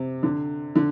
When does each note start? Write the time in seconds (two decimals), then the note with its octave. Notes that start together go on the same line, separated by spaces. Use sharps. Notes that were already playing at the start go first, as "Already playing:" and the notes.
Already playing: C3
0.23 D3
0.76 D3